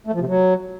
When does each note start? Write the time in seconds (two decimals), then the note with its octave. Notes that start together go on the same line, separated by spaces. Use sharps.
0.07 A3
0.14 F3
0.21 C3
0.28 F#3